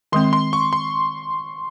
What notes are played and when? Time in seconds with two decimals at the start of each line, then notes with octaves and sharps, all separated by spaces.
0.12 D#3 G#3 C4 C6
0.33 C6
0.53 C#6
0.73 C6